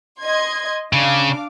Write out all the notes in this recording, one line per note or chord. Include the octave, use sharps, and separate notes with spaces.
D#5 C6 G#6
C#3 D4 F5 D6